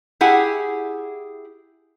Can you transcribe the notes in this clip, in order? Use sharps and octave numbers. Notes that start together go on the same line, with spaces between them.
E4 G4 G#4 F#5